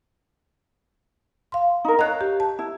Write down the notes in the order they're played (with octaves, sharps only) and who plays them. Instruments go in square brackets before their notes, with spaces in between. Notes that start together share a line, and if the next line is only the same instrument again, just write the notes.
[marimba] F5 C6
[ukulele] D#4 A#4
[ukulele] C#5 F5 A#5 [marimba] D#5 F#6
[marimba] G4
A5
[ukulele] E4